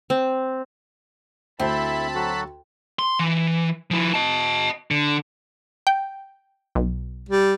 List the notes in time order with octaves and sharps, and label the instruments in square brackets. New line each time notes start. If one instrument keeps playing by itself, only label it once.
[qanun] C4
[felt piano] D2 [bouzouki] C4 [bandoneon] E4 A4 E5 [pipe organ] A5 B5
[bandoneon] F#3 F#4 A4
[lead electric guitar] C6
E3
F3 E4
D#5 A5
D3
[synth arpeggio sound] G5
B1
[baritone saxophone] G3